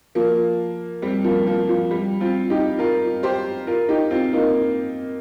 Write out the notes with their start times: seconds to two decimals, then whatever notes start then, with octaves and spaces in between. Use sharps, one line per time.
0.15 F3 A#3
1.02 G3 C4
1.24 F3 A#3
1.46 F3 A#3
1.69 F3
1.91 G3
2.20 C4 F4
2.50 D#4 G4
2.79 F4 A#4
3.23 G4 C5
3.67 F4 A#4
3.89 D#4 G4
4.11 C4 F4
4.33 A#3 D#4